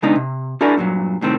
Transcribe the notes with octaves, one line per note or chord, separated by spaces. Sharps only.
C#3 G#3 B3 D4 D#4
C3
D4 E4 F#4 G#4 A#4 D5
G2 A#2 F#3
C2 A2 D#3 C4